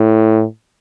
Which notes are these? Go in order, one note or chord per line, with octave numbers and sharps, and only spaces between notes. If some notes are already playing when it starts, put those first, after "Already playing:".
Already playing: A2